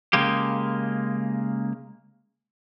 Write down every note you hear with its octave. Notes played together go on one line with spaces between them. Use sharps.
C#3 G#3 A#3 G4